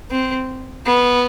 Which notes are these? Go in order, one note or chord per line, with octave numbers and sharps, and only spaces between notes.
C4
B3